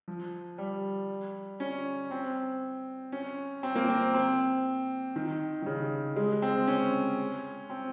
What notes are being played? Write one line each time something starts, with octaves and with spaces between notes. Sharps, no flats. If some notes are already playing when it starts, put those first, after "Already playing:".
F3
G3
C#4
C4
C#4
C4
A#3
C4
C4
D#3
D#3
C#3
G#3
C4
C#4
C4